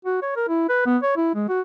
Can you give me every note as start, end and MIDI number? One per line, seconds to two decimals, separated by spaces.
0.05 0.19 66
0.22 0.32 73
0.36 0.44 70
0.48 0.66 64
0.69 0.86 71
0.86 0.98 59
1.03 1.11 73
1.17 1.31 64
1.35 1.46 56
1.49 1.61 66